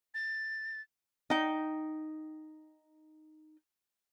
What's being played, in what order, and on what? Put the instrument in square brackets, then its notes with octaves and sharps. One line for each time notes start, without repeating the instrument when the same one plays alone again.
[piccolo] A6
[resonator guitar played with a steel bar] D#4 G5